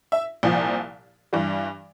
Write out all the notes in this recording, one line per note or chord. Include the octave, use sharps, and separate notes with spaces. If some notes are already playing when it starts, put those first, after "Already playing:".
E5
C2 A#2 F3
G2 E3 G3